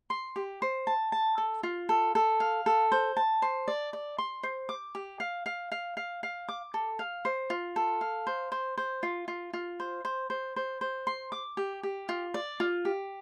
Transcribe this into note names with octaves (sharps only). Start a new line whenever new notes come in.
C6
G4
C5
A5
A5
A4
F4
A4
A4
F5
A4
C5
A5
C5
D5
D5
C6
C5
D6
G4
F5
F5
F5
F5
F5
D6
A4
F5
C5
F4
A4
F5
C5
C5
C5
F4
F4
F4
C5
C5
C5
C5
C5
C6
D6
G4
G4
F4
D5
F4
G4